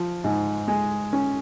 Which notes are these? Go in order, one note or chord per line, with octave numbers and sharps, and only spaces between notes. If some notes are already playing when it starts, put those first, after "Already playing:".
Already playing: F3
G#2
G#3
C#4